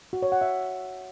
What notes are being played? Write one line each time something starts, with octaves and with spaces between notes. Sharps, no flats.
F#4
C#5
F#5
E5